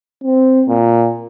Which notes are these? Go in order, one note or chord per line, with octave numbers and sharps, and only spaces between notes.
C4
A#2